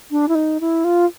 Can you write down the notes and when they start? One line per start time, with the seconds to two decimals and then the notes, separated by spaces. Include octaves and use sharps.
0.11 D4
0.28 E4
0.35 D#4
0.60 E4
0.84 F4